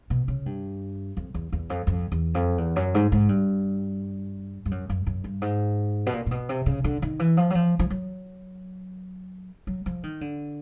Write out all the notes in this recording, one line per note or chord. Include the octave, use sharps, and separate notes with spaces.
B2
C#3
G2
F2
E2
E2
F2
F2
E2
F2
E2
F#2
G#2
G#2
G2
G2
F#2
F#2
F#2
G2
G#2
B2
A#2
A#2
B2
C3
C#3
D3
D#3
E3
F3
F#3
F3
F3
F#3
F#3
F3
D#3
D3